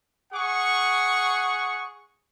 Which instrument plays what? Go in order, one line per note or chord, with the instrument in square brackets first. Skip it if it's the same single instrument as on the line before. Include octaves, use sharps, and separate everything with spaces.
[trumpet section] G#4 F#5 C#6